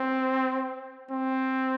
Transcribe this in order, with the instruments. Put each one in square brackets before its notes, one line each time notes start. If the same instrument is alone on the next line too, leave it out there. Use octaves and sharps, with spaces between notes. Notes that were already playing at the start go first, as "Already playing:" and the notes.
Already playing: [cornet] C4
C4